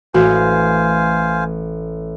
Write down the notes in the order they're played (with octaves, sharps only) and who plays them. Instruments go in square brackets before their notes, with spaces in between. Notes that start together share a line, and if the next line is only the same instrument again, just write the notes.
[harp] A1 [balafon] F#4 [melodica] C5 F5 G#5